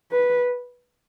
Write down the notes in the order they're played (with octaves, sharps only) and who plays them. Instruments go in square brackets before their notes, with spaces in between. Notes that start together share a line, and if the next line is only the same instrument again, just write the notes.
[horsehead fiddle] B4